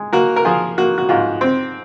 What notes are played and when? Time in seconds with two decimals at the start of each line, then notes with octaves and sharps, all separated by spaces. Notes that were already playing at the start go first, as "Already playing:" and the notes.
Already playing: G#3
0.12 A#3 F#4 A#4
0.36 A#4
0.45 F3 F4 G#4
0.78 A#3 F#4
0.98 F#4
1.09 G#2 F4
1.41 C4